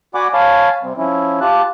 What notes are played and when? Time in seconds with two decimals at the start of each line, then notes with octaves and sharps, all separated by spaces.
0.15 F#4 D5 F#5 G#5 B5 D6
0.34 C#5 F5 G#5 A5 B5
0.83 C3 G3 C4
0.97 F3 C#4 E4
1.41 F4 G4 A5 F#6